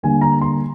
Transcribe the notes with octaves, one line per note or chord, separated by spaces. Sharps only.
D3 G3 A#3 G#5
A#5
C6